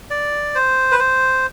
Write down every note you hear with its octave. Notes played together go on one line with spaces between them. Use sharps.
D5
C5
B4
C5